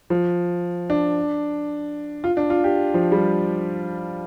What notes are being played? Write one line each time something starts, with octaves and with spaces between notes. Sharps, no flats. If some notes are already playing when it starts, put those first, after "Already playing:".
F3
D4
F4
D4
F4
G4
F3
G3